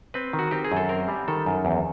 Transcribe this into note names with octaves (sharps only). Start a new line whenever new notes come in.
C4 B4
D#3
F#4
C4 G4
G#4
F#2
A4
C4 A#4
G3
D#3 A4
F#2
E2